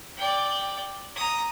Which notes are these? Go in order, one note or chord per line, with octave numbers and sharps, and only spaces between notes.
D5 G5
A#5 D#6